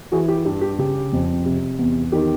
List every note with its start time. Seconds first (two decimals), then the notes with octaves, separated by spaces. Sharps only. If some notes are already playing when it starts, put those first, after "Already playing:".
0.12 E3 F#4 G#4
0.28 G4
0.45 G2 G4
0.61 G4
0.79 C#3 G4
1.13 F2
1.45 C3
1.79 E2
2.12 D#3 G4